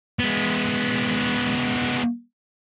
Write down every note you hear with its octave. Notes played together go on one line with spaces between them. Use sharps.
G#3 B3